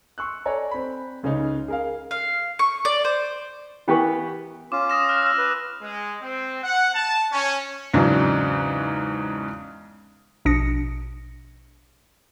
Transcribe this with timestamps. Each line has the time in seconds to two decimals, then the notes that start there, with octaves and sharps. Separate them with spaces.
0.18 C6 C#6 E6 F#6
0.45 A4 C#5 D5 G#5 A#5
0.71 C4 B5
1.23 C#2 C#3 G#3 C#4 D#4
1.68 G#4 A#4 F5
2.11 F5
2.59 C#6
2.85 D5
3.05 C5
3.88 E3 B3 G4 A#4 B4 C#6
4.72 C#4 F4 D6
4.90 D#6 A#6 E7
5.09 F6 F#6
5.22 E6 A#6
5.38 B4
5.82 G#3
6.22 C4
6.63 F#5
6.95 A5
7.32 C#4
7.94 E2 G#2 C#3 F#3 D4
10.45 A#1 B2 D4 D#6 A#6 C#7